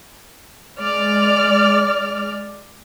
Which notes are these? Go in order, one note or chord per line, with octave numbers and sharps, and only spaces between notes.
G#3 D5 F6